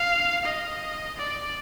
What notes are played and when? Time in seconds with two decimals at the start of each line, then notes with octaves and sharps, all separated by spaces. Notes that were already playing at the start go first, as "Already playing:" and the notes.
Already playing: F5
0.45 D#5
1.18 D5